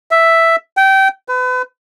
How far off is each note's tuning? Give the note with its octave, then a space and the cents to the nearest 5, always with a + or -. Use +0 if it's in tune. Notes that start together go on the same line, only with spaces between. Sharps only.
E5 +0
G5 -25
B4 +35